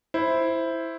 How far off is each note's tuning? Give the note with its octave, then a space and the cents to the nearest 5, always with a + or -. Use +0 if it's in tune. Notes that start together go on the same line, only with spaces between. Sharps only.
E4 +0 C5 +0